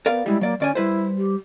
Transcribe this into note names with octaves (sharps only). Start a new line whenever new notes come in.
B3 A#4 D5 F5
G3 G#3 E4
F#3 A#3 D5
D2 C#4 D5 G#5
G3 E4 B4 C5
G4